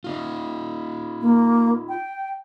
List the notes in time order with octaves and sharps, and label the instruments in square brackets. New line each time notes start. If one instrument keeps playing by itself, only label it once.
[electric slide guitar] D#4 F4
[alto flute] A#3
G5